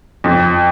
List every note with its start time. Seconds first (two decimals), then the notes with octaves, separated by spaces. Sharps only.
0.24 F2